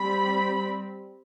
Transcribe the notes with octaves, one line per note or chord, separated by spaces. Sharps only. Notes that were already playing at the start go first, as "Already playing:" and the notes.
Already playing: G3 C4 B5